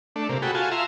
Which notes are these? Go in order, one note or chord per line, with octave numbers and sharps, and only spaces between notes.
A3 D4
C3 A#3
F#4 G#4 A4 G5 B5
F4 F#4 G#5 A5
E5 F5 A#5 C6